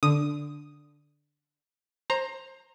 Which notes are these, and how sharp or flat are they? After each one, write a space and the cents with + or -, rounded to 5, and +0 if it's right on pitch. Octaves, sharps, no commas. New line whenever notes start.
D3 +0 D#6 +0
C5 +25 A#5 +0